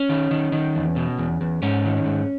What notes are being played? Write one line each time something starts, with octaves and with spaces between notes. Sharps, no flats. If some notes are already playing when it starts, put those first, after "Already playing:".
Already playing: C#4
D#3
D#3
D#3
E2
B2
E2
E2
G#2 C#4
D#3
G#2